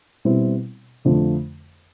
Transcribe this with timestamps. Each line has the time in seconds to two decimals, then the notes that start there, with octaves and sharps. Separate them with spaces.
0.25 B2 G3 C4 E4
1.05 F2 D3 F3 A3